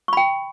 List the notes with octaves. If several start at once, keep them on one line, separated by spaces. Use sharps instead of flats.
G5 B5 C#6